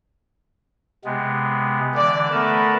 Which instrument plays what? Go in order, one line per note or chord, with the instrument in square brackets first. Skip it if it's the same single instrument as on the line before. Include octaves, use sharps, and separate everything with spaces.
[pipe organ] C3 G#3 B3
[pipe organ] D3 E3 [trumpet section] D5
[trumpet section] A3 B3 [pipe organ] A#4 B4 A5